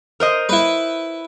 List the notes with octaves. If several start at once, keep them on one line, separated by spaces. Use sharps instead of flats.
A#4 C5 D#5
E4 B4